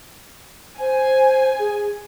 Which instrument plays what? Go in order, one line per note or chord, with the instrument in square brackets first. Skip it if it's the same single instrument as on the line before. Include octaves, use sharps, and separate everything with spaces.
[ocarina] C5 [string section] G#5
[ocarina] G#4